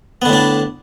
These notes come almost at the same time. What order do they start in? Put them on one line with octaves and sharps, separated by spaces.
B3 D3 A2 D4